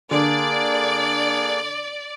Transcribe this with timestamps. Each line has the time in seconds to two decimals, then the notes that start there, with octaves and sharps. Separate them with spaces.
0.11 D3 A#3 D4 G#4 D5